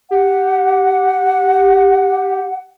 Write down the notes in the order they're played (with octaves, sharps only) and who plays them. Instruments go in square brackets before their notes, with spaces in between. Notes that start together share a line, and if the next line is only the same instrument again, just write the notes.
[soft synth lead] G4 [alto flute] F#5